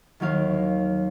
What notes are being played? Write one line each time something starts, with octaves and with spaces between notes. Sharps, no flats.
D#2 D#3 F#3 F5